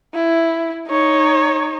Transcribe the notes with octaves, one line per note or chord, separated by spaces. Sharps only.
E4
D#4 C#5